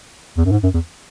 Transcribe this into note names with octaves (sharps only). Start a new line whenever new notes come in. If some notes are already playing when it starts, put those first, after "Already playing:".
E2
F#2
G#2
F#2
E2